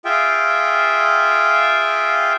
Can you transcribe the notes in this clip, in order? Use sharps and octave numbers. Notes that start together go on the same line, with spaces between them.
F4 G#4 E5 F5 G5